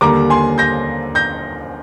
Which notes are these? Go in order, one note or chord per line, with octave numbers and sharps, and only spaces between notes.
D#2 D3 G3 A#3 A#5 D6
G#5 C6
G6 A#6
G6 A#6